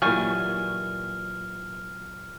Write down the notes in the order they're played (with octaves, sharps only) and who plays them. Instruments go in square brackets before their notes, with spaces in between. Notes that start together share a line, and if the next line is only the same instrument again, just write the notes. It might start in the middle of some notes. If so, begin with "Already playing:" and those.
[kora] A#2 E3 F#3 [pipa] G3 G#5 C#6 [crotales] F6